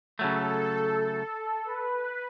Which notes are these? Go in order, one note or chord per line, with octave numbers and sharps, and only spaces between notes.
C#3 F#3 A3 A4
B4